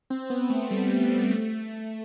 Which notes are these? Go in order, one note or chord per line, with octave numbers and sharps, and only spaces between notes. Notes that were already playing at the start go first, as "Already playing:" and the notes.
C4
B3
A3
G3
A3